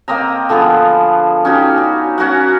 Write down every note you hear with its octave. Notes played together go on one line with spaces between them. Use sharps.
A#3 C4 D#5 A#5
D3 F3 B3 G#4
C#4 D#4 F#4 G4
F#4
C#4 F#4 A#4 F#5